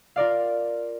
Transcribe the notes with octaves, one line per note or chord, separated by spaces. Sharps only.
F4 A#4 D5 F5